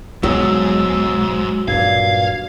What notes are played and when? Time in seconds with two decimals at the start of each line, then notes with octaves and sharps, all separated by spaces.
0.23 B1 G#2 F#3 E6
1.68 G2 A#2 F5 G#6